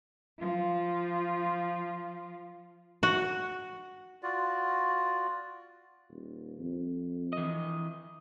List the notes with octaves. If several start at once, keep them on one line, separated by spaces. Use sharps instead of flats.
F3 F4
F#4
F4 F#4 D5
D#1
F2
E3 D#5